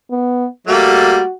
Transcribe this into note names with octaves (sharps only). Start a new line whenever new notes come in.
B3
G3 A3 A#3 F#4